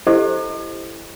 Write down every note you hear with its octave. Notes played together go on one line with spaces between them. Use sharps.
E4 G4 A4 C5 D#5